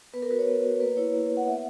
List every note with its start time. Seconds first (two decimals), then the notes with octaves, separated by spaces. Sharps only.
0.14 B3 B4
0.22 A#4
0.30 F#4 B4
0.39 C#5
0.47 B3
0.64 F#4
0.80 A#3 B4
0.97 E4 C#5
1.14 A#3
1.29 E4
1.37 F#5
1.46 B3 E5